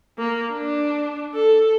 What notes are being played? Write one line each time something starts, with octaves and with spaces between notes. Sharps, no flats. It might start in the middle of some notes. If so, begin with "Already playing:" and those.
A#3
D4
A4